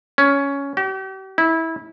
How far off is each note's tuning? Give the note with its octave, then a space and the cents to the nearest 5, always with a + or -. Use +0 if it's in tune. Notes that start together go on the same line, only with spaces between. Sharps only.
C#4 +10
G4 -40
E4 -20